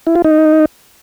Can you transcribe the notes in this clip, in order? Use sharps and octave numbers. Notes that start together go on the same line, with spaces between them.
E4
F4
D#4